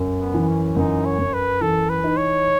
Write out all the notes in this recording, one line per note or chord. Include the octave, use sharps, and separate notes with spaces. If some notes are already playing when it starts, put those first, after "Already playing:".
Already playing: F#2
B3
E3
C#4
F#2 D#4
C#5
F#2
B4
E3 A4
B4
D#4
C#5